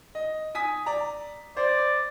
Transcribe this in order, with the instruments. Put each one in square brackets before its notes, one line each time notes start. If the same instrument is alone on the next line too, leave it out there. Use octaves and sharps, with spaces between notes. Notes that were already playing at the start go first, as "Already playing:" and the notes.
[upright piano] D#5
G#5 D#6 B6
D5 A#5
[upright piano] C5 [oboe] D5